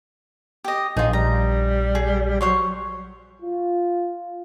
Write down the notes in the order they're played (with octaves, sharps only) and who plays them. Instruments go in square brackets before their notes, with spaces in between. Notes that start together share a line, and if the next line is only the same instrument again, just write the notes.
[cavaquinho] G4 D#5
[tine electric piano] A#1 [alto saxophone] D#4 [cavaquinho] F4 G#4
[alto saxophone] G3 [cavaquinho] A#5
[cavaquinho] G#4
[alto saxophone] F#3 [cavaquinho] C5 C#5 C6
[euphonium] F4